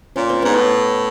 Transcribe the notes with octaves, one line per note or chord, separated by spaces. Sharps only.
A#2 C#4
C4
G#2 B3 C#4
A2